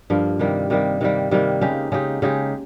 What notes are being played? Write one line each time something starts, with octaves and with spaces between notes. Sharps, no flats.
G2 F3 A#3
C3 D#3 G3 A#3
C3 D#3 G3 A#3
C3 D#3 G3 A#3
C3 D#3 G3 A#3
C#3 G#3 D#4 G4
C#3 G#3 D#4 G4
C#3 G#3 D#4 G4